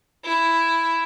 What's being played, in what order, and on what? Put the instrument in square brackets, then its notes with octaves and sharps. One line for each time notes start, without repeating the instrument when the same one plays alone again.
[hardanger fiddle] E4